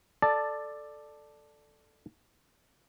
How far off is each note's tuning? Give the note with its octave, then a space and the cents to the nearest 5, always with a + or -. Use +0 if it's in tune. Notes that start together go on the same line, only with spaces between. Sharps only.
A4 +0 D5 +10 A5 +0